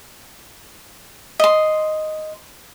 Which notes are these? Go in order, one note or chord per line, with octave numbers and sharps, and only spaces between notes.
D#5 C6